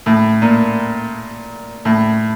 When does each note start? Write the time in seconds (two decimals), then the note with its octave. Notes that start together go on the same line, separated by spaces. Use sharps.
0.06 A2
0.42 A#2
1.85 A2